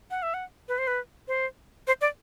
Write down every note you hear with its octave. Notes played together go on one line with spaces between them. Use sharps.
F#5
E5
F#5
B4
C5
B4
C5
C5
D5